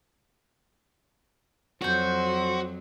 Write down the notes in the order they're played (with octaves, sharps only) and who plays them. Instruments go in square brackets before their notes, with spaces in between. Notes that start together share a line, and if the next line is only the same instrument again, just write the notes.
[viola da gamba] F2 F#3 [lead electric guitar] F#4 [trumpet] C5 [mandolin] C#5 G6